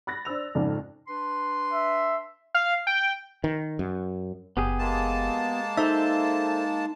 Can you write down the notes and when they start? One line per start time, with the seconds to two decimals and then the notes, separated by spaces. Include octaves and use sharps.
0.07 B5 F#6 A6 A#6
0.25 D4 C5 E6 F7
0.55 F2 G#2 C#3 D5
1.08 D4 B4 C6
1.73 E5
2.54 F5
2.87 G5
3.44 D#3
3.79 F#2
4.57 F#1 B3 G4 G#4
4.79 G#3 A#3 A5
5.77 D#4 A4 C5 E5